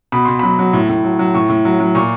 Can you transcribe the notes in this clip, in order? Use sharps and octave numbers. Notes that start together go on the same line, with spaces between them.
B2 B5
B2 C6
F#3 B5
F#3
A2
A2
F#3
F#3
A2 C#6
A2
F#3
F#3
A#2 C#6